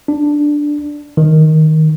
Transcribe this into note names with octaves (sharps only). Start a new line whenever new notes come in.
D4
D#3